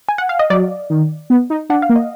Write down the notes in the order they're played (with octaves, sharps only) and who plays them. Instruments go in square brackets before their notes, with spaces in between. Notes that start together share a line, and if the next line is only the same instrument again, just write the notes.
[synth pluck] G#5
F#5
F5
D#5
[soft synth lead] F#3 [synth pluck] D5
[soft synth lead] D#3
B3
D#4
[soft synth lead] D4 [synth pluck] F#5
[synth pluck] F5
[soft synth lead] A#3
[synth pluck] D#5